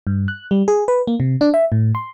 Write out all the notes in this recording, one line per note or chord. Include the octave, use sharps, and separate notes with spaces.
G2
F#6
G3
G#4
B4
A#3
C3
D4
E5
A2
C6